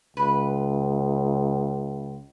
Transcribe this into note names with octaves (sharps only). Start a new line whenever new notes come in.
C#2 B4